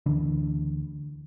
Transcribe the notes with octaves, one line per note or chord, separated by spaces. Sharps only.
D2 D3 E3 D4